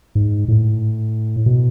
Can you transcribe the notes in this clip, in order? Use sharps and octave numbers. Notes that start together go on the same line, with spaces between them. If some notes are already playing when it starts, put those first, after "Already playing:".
G#2
A2
B2